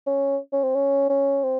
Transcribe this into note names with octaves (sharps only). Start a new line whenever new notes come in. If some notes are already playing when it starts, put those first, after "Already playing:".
C#4
C#4
C4
C#4
C#4
C4